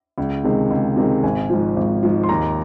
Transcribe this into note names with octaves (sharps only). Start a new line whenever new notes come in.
C#2
C3 D#3 G#3
C#2
C3 D#3 G#3
G#1 G#5
G#2 F3
G#1
G#2 F3
C6
D#2 A#5